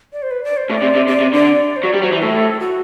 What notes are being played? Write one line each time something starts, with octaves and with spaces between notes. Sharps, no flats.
D5
C5
B4
D5
C5
A2 D5
C3
C3
C3 D5
C3
D3 D5
C5
F#3 D5
G3
F#3 C5
E3
A2 A4
F#4